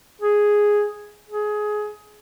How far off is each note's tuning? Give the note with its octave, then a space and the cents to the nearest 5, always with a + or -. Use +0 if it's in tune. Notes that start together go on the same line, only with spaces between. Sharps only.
G#4 +0
G#4 +20